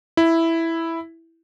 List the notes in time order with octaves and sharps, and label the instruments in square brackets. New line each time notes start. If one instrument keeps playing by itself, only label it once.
[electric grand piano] E4